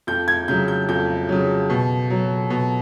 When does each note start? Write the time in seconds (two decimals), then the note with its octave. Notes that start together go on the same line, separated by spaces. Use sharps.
0.07 F2 G6
0.28 G#6
0.48 C#3 F#3 G6
0.68 G6
0.89 F2 G6
1.29 C#3 F#3
1.70 B2
2.10 F#3
2.50 B2